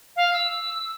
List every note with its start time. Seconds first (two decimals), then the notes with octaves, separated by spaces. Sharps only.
0.16 F5
0.33 E6